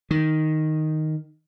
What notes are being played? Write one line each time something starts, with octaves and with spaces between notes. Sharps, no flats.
D#3